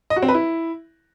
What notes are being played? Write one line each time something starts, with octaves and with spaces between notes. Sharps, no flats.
D#5
F#4
C4
B4
E4